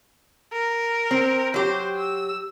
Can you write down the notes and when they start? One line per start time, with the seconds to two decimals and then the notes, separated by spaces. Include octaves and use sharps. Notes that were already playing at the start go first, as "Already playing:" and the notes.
0.52 A#4
1.11 C4
1.54 F#3 G4 C5
1.97 E6